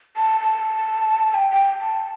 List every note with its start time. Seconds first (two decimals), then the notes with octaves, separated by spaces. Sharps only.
0.17 A5
0.40 A5
1.34 G5
1.51 G5
1.82 A5